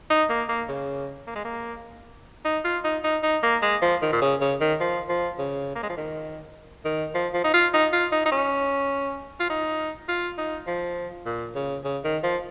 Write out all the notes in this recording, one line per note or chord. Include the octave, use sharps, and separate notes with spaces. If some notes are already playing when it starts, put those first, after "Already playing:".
D#4
A#3
A#3
C#3
A#3
G#3
A#3
D#4
F4
D#4
D#4
D#4
A#3
G#3
F3
D#3
A#2
C#3
C#3
D#3
F3
F3
C#3
A#3
G#3
F3
D#3
D#3
F3
F3
D#4
F4
D#4
F4
D#4
D#4
C#4
F4
D#4
F4
D#4
F3
A#2
C#3
C#3
D#3
F3